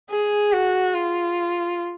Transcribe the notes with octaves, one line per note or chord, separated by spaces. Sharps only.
G#4
F#4
F4